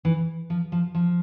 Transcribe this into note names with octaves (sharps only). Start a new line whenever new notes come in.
E3
F3
F3
F3